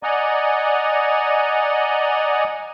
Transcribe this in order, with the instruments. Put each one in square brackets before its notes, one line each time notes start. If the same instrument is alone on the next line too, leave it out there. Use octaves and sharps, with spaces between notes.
[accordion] D5 D#5 F#5 G#5 A#5